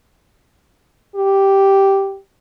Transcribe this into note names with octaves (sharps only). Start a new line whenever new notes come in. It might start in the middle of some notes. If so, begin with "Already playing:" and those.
G4